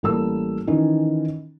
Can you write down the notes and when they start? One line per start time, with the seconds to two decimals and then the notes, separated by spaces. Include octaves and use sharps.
0.03 A1 G3 A#3 A4 A#4 E6
0.67 D#3 E3 C#4 D#4 E4